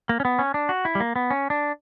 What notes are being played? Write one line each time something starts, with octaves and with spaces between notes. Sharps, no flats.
A#3
C#4
B3
C#4
D4
F#4
E4
G3
A#3
B3
C#4
D4